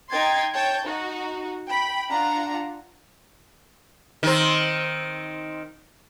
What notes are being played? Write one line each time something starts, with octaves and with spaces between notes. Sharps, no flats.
D#4 G5 C6 G#6 A6
C#5 G5 A5 G6
D#4 F#4
G5 B5
D4 F4 F#5 A#5
D#3 C4